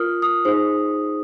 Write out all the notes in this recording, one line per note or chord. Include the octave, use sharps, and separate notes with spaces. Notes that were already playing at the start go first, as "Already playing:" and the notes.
Already playing: F4 A#4 D#6 F6
D#6
D#4 G#4 C5